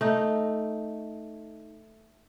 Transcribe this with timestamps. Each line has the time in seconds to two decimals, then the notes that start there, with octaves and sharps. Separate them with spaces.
0.01 A3 D#4